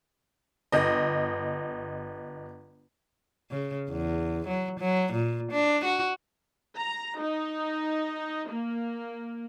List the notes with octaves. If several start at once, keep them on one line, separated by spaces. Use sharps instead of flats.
G1 D#5
C#3
E2
F#3
F#3
A#2
D4
F#4
A#5
D#4
A#3